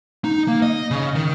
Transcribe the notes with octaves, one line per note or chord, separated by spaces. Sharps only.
D#4
A#3
D#5
C#3
D#3